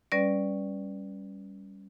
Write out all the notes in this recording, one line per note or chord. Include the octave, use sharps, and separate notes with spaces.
G3 C#4 B4 D5